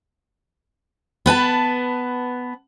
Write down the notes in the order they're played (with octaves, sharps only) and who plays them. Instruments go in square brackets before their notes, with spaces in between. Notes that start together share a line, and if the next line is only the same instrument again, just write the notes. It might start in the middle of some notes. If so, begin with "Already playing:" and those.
[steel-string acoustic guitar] B3 B4 G#5 A5